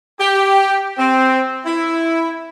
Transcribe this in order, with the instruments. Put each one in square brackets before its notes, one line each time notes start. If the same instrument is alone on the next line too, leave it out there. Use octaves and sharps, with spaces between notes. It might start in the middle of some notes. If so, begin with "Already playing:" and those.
[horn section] G4
C4
E4